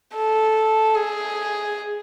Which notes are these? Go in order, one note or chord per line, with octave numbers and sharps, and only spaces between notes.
A4
G#4